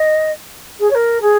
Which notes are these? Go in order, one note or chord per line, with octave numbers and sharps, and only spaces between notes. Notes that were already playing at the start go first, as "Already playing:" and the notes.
Already playing: D#5
G#4
C#5
A#4
G#4